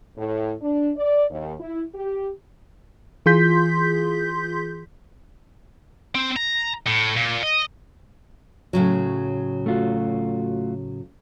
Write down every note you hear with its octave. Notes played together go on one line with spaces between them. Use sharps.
A2
D4
D5
D#2
E4
G4
E3 F4 G#4 C6 G6 B6
C4
A#5
A2
A#2
D#5
A2 C#3 F#3
A3 F4 F#4